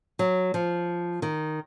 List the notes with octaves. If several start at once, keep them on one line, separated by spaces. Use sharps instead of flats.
F#3
F3
D#3